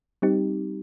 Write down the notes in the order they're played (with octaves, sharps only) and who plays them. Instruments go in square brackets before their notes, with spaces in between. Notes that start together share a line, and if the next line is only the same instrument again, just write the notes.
[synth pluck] G3 C4 D#4 G4